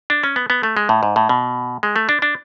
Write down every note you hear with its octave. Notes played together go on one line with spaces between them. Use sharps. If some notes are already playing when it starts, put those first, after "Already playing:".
D4
C#4
B3
B3
A3
G#3
A2
G#2
A2
B2
G#3
A3
D4
D4